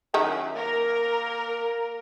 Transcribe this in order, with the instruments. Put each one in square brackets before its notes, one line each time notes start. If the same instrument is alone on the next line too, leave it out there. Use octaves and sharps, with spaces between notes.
[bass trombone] F#2 [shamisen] D#3 D#4 E4
[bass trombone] A#3 [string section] A#4